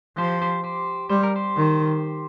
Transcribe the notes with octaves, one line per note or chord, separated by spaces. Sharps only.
F3 G4 C5
G4 C5
G4 C5
G3 C5
A#4
G4 C5
D#3